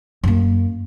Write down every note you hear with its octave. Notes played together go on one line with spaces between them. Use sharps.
F#2 A#3